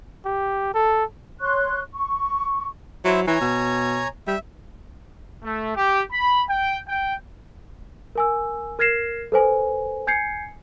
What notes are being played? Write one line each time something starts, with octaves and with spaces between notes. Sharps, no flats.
G4
A4
C#5 C6 C#6 F#6
C#6
F#3 E4 C5 E5
E3 C#5 G#5 A#5
B2
G3 E5
A3
G4
B5
G5
G5
A#4 G#5 E6
A#4 F6 G#6 A#6 C7 E7
A4 B4 C5 G#5
G#5 G6 G#6 C7 C#7